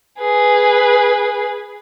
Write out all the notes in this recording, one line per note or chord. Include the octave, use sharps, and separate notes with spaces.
G#4 B4